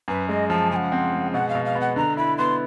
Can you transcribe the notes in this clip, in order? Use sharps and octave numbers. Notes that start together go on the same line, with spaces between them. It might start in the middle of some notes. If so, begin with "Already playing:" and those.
F#2 B4
G#3 D#5
F3 A5
C#3 G#5
F#5
C4
G#3
B2 F#5
F5
B2
F5
B3
F#5
D3 A#5
E4 B5
B3 C6